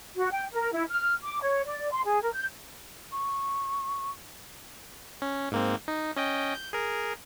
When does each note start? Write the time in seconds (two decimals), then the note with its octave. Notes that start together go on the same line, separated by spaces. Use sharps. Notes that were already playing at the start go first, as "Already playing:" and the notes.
0.17 F#4
0.31 G5
0.53 A#4
0.72 E4
0.89 F6
1.23 D6
1.42 C#5
1.66 D5
1.92 C6
2.05 G#4
2.22 A#4
2.34 G6
3.12 C#6
5.22 C#4
5.52 G#2 A#3 C4
5.88 D#4
6.16 C#4 D#5 G5
6.55 G6
6.73 G#4 A#4